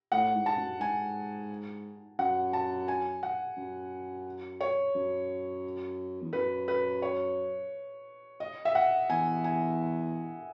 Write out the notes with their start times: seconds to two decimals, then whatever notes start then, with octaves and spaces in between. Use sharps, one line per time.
0.12 A2 F#5
0.35 G#2
0.46 A5
0.58 F#2
0.80 G#2 G#5
2.19 F#2 F#5
2.53 A5
2.88 G#5
3.23 F#5
3.57 F#2
4.61 C#5
4.95 F#2
6.21 E2
6.33 F#2 B4
6.68 B4
7.02 C#5
8.40 D#5
8.65 E5
8.75 F#5
9.09 E2 G#5
9.44 G#5